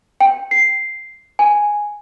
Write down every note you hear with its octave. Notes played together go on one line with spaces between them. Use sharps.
G5
C7
G#5